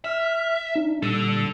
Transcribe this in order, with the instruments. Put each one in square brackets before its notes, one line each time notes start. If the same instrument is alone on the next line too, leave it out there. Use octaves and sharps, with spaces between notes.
[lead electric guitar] E5 [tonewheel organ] F6
[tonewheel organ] D4 D#4
[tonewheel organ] A#2 G3 E6 [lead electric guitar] D4 A4